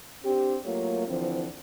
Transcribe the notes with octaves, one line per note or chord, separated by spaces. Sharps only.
C4 D4 G4
F#3 A3 A#3 F4 C#5
D3 E3 F3 C4